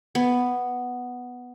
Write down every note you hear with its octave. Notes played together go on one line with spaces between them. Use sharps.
B3